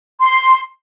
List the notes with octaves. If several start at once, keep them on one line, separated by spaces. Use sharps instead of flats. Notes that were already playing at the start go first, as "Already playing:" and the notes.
C6